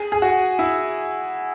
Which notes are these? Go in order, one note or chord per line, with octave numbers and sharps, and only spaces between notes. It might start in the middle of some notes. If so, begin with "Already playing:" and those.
Already playing: G#4
G#4
F#4
E4